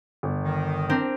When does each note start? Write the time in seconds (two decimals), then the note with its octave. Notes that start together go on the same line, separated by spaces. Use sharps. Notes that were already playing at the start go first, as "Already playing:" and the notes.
0.23 G1
0.44 D#3
0.89 C4 D4 A#4